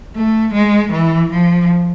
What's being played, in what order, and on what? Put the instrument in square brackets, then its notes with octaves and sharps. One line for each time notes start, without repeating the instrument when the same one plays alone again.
[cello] A3
G#3
E3
F3